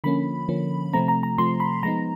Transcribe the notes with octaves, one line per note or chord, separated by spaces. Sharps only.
D3 F3 A#3 C#4 B5
D3 F3 A#3 C#4
C3 F3 A3 C4 A#5
A#5
A#5
C3 F3 A3 C4 C6
B5
F3 G#3 B3 D#4 A#5